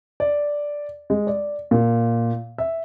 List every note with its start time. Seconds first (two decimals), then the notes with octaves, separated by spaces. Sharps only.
0.20 D5
1.10 G#3
1.27 D5
1.71 A#2
2.58 E5